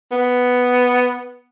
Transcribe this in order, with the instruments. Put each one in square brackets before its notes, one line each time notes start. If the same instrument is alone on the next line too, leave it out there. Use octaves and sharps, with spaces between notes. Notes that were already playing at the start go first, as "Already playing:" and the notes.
[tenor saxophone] B3